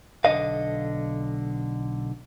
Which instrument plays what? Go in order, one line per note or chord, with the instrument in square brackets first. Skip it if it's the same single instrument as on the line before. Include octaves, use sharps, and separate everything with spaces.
[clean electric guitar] B1 D3 D#5 F5